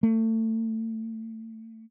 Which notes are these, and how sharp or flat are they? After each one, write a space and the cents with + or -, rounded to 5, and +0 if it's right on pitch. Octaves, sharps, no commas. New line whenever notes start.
A3 +30